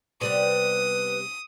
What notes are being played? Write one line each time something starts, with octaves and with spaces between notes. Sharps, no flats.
C3 G3 B3 B4 D#6